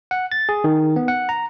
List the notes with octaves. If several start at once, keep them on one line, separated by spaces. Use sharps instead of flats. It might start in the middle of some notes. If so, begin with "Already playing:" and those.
F#5
A6
G#4
D#3
B3
F#5
A#5